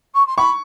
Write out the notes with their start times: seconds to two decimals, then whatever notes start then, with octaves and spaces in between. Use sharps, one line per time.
0.14 C#6
0.27 C6
0.37 B5 C#6